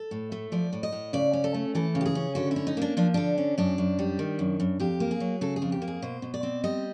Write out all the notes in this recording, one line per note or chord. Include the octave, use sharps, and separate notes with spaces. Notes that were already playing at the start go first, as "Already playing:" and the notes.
Already playing: A4
A2
A3
F3 D5
A2
D#5
A2
C#3 D5
C#4
A4
A3
E3 A4
C#3
G4
G#4
C#4
D3 F#4
E4
C#4
D#4
A#3 D4
F3 D4
D3 D4
C#4
F#2 D4
F#2
G3
D#3
F#2
F#2
F2 G4
A#3
G#4
F#3
C#3 A4
G#4
F2
G4
A#3
G#4
B2 C5
B2
D5
C4
G3 D#5